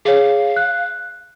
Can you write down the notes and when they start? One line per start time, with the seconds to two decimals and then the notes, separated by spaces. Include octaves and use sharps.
0.05 G#4 C#5 F5
0.56 F#6